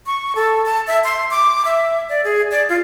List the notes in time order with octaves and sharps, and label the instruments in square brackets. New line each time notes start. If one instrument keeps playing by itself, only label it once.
[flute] C#6
A4
A5
E5
C6
D6
E5
D5
G#4
D5
F4